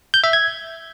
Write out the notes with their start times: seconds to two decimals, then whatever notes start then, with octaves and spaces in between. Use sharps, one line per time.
0.14 G6
0.24 E5
0.33 G#6